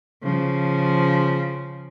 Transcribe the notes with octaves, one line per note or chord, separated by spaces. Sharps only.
C#3 F3